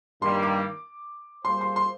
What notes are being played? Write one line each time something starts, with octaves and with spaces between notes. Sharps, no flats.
G2 D#3 G3 A#3 C6
D6
G3 A#3 F4 G#4 C5 C6
C6
C6